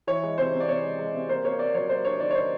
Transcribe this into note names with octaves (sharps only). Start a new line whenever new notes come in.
E3 C#5
G#3
C3 C5
C3
D5
C3 C#5
G#3
G#3
C3
A#3 C5
A#3 C#5
A#3 D5
F#3 C#5
A#3 C5
D4 C#5
D#3 D5
C#5
D#3 C5